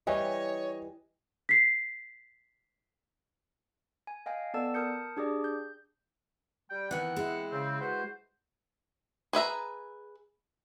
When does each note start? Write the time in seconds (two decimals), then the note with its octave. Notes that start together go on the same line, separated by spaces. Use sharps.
0.07 E3 G3 C#5 D#5 G#5
1.49 B6 C7
4.07 G#5
4.26 D#5 F5 G5 G#5
4.54 B3 A4 D5 A5 E6
4.74 A#4 A5 D#6 G6 C#7
5.17 D4 G4 G#4 D5
5.44 G6
6.70 G3 G5
6.91 D#3 E3 B3 C4 F#5
7.16 G#3 E4
7.51 C#3 C4
7.80 F#4 B4 C5
9.33 G#4 B4 E5 A#5